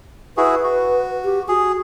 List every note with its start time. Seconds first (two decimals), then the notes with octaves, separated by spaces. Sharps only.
0.37 E4 F#4 G#4 B4
0.64 F#4
1.24 G4
1.48 F#4 G#4